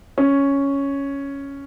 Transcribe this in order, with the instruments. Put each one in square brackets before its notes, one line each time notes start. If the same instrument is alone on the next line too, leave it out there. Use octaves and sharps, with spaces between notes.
[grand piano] C#4